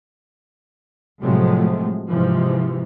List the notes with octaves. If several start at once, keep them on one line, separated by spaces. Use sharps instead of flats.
A2 C3 F3 F#3 G#3 A3
G#2 C3 E3 F3